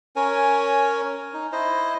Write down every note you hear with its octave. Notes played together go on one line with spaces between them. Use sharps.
C#4 A#4 C#5 G#5
D#4
E4 C5 D#5